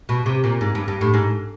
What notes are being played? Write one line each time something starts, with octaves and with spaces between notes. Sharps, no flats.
B2
C3
A#2
G#2
G2
G2
A2
G#2